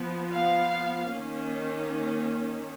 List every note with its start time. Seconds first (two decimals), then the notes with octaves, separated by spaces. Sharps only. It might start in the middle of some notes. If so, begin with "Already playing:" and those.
Already playing: F3 B3
0.31 F5
1.10 D#3 A#3 C#4